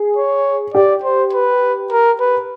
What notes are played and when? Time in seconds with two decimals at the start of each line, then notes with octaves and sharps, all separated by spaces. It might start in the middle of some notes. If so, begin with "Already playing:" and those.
Already playing: G#4
0.17 C#5
0.74 G4 D5
1.03 C5
1.33 B4
1.91 A#4
2.20 B4